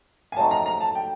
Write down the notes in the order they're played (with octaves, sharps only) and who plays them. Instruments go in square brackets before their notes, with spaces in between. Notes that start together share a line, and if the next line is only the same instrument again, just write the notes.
[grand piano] G#5
[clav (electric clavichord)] F#3 A3 C4 D#4 [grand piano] A5
[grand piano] A#5
A#5
A5
G5